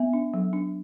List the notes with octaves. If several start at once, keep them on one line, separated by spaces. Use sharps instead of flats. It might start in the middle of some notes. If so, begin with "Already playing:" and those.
Already playing: B3 E5
D4
F#3
D4